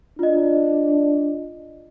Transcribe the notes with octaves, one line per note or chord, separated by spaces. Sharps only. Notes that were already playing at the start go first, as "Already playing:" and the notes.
D4 F4 D#5